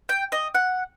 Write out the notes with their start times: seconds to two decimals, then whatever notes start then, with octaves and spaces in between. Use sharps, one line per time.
0.09 G5
0.32 D#5
0.55 F#5